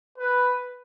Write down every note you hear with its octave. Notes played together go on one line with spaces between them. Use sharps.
B4